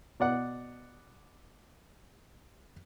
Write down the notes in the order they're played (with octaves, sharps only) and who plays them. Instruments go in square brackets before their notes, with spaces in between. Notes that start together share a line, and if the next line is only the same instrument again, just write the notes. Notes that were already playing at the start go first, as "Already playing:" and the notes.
[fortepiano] B2 D5 F#5